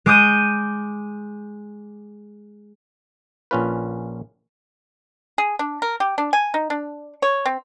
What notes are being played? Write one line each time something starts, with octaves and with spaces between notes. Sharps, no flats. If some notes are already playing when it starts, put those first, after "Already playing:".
G#3 D6 D#6 G6 D#7
A#1 A#2 C#4 F4 B4
G#4
D4
A#4
G4
D4
G#5
D#4
D4
C#5
C4